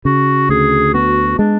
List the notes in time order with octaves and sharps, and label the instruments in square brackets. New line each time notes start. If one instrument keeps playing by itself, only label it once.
[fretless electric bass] C#3 [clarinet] F#4
[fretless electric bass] D2 [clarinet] G#4
[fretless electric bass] B3 [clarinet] F#4
[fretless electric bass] G#3 [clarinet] D4